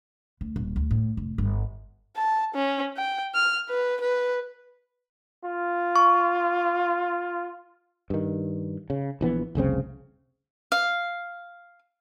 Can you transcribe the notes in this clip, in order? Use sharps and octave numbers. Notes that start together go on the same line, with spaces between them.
D2
D#1
D2
A2
F1
G1
A5
C#4
G5
F6
B4
B4
F4
C#6
G2 D#3
C#3
A#1 E3 B3
F1 C2 C#3 C4
F5